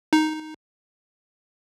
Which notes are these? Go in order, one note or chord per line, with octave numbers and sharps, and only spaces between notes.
D#4